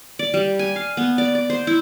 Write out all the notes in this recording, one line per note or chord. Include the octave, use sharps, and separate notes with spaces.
D5
G3
G#5
F5
B3
D5
D5
C5
E4